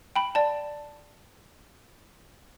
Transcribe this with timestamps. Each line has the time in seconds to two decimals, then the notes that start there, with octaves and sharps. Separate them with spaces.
0.16 G5 B5
0.35 D5 A5